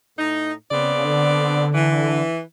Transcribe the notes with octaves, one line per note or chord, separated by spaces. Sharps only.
A2 D#4
C#3 B3 C4 D5
D3
E3